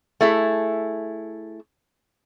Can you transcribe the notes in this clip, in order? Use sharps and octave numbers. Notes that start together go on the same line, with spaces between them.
A3 E4 G#4